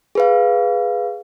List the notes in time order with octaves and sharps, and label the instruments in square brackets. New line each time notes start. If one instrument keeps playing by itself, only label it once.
[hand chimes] G#4 B4 F5